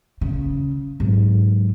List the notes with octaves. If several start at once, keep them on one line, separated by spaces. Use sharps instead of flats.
C#3
G#2 F#3